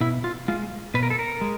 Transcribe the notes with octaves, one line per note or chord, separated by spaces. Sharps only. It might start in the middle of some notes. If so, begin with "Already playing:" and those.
B2 E4
F4
G#3 F4
B2 B4
A#4
A4
A#4
G#3